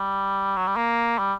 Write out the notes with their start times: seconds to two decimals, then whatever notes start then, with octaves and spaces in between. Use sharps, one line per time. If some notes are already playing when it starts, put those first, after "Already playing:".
Already playing: G3
0.57 F#3
0.67 G3
0.77 A#3
1.19 G3